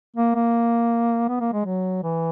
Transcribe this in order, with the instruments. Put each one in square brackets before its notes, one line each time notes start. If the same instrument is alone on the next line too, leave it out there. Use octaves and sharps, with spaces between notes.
[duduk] A#3
A#3
B3
A#3
G#3
F#3
E3